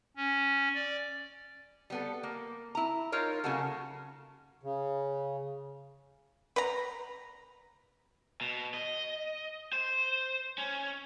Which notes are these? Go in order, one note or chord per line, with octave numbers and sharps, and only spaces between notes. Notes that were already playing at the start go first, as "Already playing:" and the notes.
C#4
D5
G3 B3 A4
A#3
E4 A#5
D#4 F4 A#4 C#5
C#3 F#3 A#3 F#4 A4
C#3
B4 A#5
B2
D#5
C5
C#4